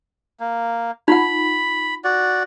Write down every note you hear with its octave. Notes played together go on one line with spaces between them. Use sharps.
A#3
D#4 F4 F#5 B5
F#4 D5